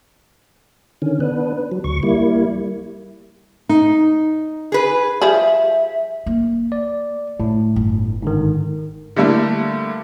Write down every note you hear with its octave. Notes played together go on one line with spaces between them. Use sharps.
D3 D#3 C#4
B3 D4 B4
F#3
D2 C#6
G3 A#3 E4
D#4
G#4 B4
F3 G3 G#4 E5
A#3
D5
A2 E4
G1
G#2 D3 D#3
D3 G3 A3 A#3 E4